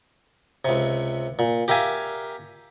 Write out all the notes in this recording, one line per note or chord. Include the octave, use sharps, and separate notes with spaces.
C#2 C3
A#2
G4 A#4 E5 F5 G#5